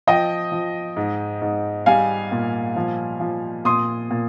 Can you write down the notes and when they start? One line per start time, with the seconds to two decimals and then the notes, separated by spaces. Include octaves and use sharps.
0.07 F3 D#5 G5
0.52 F3
0.97 G#2
1.42 G#2
1.86 G3 F5 G#5
2.32 A#2
2.76 F3
3.20 F3
3.65 A#2 C6 D#6
4.11 A#2